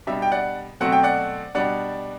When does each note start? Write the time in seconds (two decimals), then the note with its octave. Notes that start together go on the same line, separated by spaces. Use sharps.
0.07 B2 G3 D4 E5
0.22 G5
0.32 D5 F#5
0.80 B2 F#3 A3 C4 F#5
0.92 G5
1.03 D5 F#5
1.55 B2 G3 D4 D5 F#5